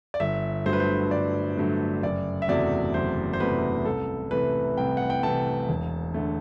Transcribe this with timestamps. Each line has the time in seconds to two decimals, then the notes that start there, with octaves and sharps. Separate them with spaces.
0.14 D5
0.20 G1 E5
0.66 G2 D3 F#3 A3 C5
0.73 B4
0.80 C5
1.11 G1 D5
1.57 G2 D3 F#3 A3
2.03 F#1 D5
2.42 E5
2.48 E2 C3 F#3 A3 D5
2.94 F#1 C5
3.33 C5
3.40 E2 C3 F#3 A3 B4
3.85 C2 A4
4.31 C3 E3 A3 B4
4.77 C2 G5
4.97 F#5
5.10 G5
5.23 C3 E3 A3 A5
5.69 E1
6.14 D3 A3